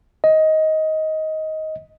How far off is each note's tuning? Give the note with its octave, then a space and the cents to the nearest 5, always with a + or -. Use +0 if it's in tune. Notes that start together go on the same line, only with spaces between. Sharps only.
D#5 +15